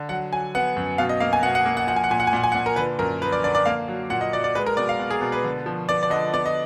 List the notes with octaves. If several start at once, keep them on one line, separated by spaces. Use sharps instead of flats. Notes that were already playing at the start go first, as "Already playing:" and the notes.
Already playing: D3
F#3 F#5
F#3 G#5
B3 F#5
F#2
B2 F5
D#5
A#3 F5
G#5
B2 F#5
F#5
A#3
F#5
F3 F#5
G#5
F#5
A#2 G#5
F#5
G#5
A#2 F#5
G#5
F#5
A#2
A#4
D3 B4
F#2 A#4
F3 B4
D5
D3 D5
D5
A#3 F5
F#3
A#2 F#5
D#5
F#3 D5
D5
G#3 B4
A#4
B2 D5
F5
B2
G#4
B2
B4
D3
F3
B3 D5
D5
D3 D#5
B3 D5
D#5